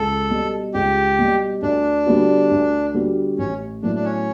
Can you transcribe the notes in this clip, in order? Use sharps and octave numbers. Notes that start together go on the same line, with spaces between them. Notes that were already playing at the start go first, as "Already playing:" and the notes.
Already playing: C#2 A4
B2 G3
C#2 G4
B2 G3
D2 D4
D3 G3 B3 F#4
D2
D3 G3 B3 F#4
A1 C#4
A2 F#3 B3 D4 E4
D4
C#4